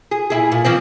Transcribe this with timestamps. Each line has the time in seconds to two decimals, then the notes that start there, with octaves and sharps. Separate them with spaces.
0.11 G#4
0.30 A#2 E4 G#4
0.52 A#2
0.64 E3 F3 C4